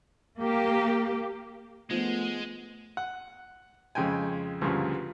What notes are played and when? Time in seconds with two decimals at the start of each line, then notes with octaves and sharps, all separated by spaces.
0.39 A#3 G4
1.91 F3 G#3 A3 B3
2.97 F#5
3.95 F2 C#3 G#3 G5 G#5
4.61 D2 G2 A#2 C#3 F3